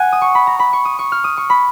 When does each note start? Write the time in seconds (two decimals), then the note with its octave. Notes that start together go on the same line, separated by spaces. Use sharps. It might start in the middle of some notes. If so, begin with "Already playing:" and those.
Already playing: F#5 G#5
0.12 D#6
0.21 C#6
0.35 B5
0.47 A#5
0.59 B5
0.73 C#6
0.85 D#6
0.99 C#6
1.12 F6
1.24 D#6
1.37 C#6
1.50 B5